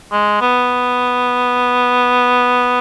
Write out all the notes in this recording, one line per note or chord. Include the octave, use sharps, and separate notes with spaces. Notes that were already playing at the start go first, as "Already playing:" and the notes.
G#3
B3